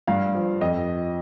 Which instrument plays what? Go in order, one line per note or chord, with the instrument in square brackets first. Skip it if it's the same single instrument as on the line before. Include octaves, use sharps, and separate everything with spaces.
[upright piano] G2 F5
F3
F2 D#5